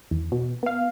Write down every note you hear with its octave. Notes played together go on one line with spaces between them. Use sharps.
E2
B2
B3 F5